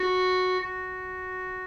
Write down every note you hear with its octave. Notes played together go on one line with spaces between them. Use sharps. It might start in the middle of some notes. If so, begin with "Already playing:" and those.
Already playing: F#4
F#4